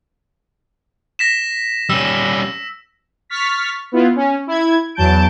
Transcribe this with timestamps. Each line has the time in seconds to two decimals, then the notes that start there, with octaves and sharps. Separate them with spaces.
1.19 A#6 B6 E7
1.90 G3 C#4 E6
3.30 C#6 F6 A6 B6
3.92 B3 E4 F4
4.16 C#4
4.47 E4 G#6
4.95 E2 F#3 A5 G6 D7